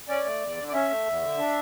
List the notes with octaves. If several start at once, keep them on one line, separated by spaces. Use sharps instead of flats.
C#4 D5
A3
E2
D3
D5
C#4 E5
A3
E2
D3
D4